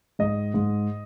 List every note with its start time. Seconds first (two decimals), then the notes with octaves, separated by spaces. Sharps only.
0.19 G#2 D#5
0.54 G#2